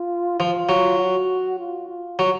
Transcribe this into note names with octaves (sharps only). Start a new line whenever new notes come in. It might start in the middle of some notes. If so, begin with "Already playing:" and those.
Already playing: F4
F3 F4
F#3
F#4
F4
F4
F#3